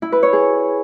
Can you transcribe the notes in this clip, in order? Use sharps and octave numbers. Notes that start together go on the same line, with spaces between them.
E4
B4
C#5
G#4